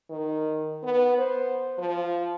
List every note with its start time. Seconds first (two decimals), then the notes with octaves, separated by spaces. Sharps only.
0.10 D#3
0.83 B3
1.18 C5
1.78 F3